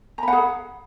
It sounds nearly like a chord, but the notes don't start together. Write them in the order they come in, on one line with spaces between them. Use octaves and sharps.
A#5 B5 F#5 G#4